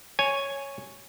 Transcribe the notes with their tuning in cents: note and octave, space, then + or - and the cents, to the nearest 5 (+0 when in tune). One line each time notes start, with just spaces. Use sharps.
C#5 +0 G#5 +0